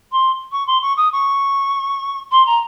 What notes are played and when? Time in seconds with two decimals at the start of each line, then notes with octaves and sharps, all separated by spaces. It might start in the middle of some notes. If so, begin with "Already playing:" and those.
0.12 C6
0.51 C#6
0.67 C6
0.81 C#6
0.96 D#6
1.12 C#6
2.31 C6
2.46 A#5